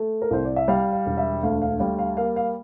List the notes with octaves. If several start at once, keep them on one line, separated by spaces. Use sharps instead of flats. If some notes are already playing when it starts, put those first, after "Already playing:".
Already playing: A3
A#4
C2 C5
D5
E5
G3 F5
F5
E1
E5
D2 F5
F5
G3 F5
F5
A#3 F5
F5